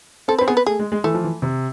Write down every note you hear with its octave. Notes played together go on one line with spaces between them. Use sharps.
C4 A4
B4
C4
B3 G#4
B4
A3 G#4
G#3
G#3
E3 A3
F3
E3
C3